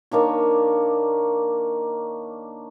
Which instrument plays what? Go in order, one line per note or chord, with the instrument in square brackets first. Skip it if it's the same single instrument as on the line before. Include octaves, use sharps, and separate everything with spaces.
[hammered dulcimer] D#3 A#3 D4 C#5